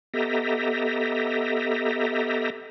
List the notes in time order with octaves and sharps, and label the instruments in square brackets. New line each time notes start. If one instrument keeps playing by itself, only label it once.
[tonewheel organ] B3 G4 A4 D#5 E5 A#5